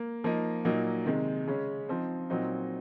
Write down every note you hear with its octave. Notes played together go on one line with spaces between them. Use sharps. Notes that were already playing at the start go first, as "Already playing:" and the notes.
Already playing: A#3
F3 A#3 D#4
A#2 F#3 A#3 D#4
C3 D#3 G#3
C#3 G#3 C#4
F3 C4 D#4
A#2 F#3 C4 D#4